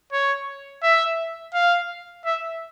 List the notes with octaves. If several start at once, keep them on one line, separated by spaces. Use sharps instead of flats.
C#5
E5
F5
E5